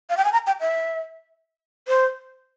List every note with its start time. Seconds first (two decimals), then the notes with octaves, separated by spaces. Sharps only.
0.10 F5
0.17 G5
0.25 G#5
0.33 A#5
0.47 G5
0.61 E5
1.88 C5